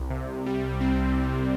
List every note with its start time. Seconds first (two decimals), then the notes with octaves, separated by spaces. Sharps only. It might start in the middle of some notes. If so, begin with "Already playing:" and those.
Already playing: C2
0.10 C3
0.46 G3
0.80 C4